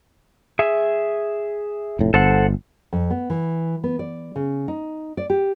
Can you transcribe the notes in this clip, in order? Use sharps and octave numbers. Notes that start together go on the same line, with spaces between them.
G#4 E5
F1 A2
G1 A4 C5 F#5
F2
B3
E3
B3
D5
C#3
D#4
D5
G4